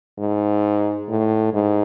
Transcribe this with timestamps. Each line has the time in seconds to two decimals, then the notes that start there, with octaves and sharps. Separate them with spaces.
0.19 G#2
1.09 A2
1.54 G#2